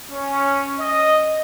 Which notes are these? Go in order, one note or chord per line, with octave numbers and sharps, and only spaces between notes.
C#4
D#5